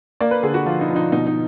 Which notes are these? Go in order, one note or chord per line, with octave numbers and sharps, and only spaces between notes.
A#3 D5
B4
D3 G#4
F#4
F3 F4
D#4
F3
D#4
B2 D#4
D#4